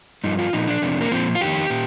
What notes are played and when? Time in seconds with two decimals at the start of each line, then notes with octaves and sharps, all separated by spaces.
0.24 G2 F3 D#4
0.39 F4
0.53 A#2 F3 D#4
0.68 D4
0.82 F2 C3
1.01 A#3
1.11 A#2 F3 C4
1.35 F4
1.41 F2 D#3 G4
1.70 A#2